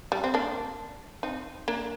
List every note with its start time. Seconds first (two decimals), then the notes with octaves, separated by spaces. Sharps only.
0.12 G3
0.24 C4
0.34 A#3 D4
1.23 C4 D#4
1.68 A#3 D4